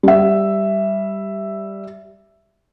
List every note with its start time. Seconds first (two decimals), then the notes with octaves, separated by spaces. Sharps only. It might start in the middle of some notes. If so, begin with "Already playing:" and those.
0.03 G3 E5